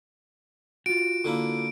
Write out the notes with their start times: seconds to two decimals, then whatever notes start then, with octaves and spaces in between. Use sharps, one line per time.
0.86 F4 F#4 D7
1.24 D3 A#3 E4